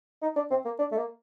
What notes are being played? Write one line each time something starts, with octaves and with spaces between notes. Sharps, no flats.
D#4
D4
C4
A#3
D4
A3
A#3